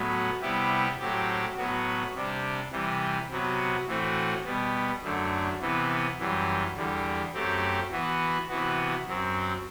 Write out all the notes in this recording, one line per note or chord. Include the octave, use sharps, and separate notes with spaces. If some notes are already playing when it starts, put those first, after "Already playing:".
Already playing: A2 F#3 B3
C3 G3 B3 E4 G4
A2 F#3 C4 G4
A2 F#3 B3 F#4
C3 G3 D4
C3 E3 G3
C3 F#3 B3 F#4
A2 E3 A3 C4 F#4
B2 G3 B3
F#2 D3 A3
C3 E3 B3
F#2 E3 G3
E2 D3 G3
F#2 F#3 A3 C4 G4
E3 B3 F#4
C3 E3 B3 F#4
F#2 F#3 C4